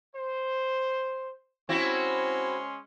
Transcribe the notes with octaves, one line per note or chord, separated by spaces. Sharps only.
C5
G#3 C4 C#4 E4 F#4 C6